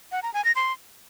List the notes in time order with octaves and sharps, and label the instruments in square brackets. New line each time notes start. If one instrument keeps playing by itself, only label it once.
[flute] F#5
A#5
G#5
A#6
C6